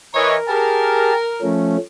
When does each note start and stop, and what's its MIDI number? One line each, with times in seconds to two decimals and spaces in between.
0.14 0.36 52
0.14 0.47 70
0.14 0.36 73
0.14 0.36 75
0.48 1.13 67
0.48 1.13 68
0.48 1.55 70
0.48 1.13 81
1.41 1.77 53
1.41 1.77 57
1.41 1.77 61